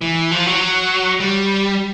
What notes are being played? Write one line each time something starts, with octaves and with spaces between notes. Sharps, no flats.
E3
F3
F#3
G3